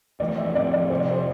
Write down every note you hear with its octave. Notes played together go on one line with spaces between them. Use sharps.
F2 E3 A3 D5
E5
A2 F3 C4 D5
D5
F2 C3 F3 C5
D5
C5